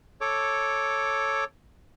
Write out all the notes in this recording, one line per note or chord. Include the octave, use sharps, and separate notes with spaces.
A4 C#5 D6